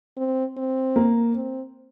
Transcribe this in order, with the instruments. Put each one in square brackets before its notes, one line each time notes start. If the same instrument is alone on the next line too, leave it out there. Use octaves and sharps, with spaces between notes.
[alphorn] C4
C4
[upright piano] A#3
[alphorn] C4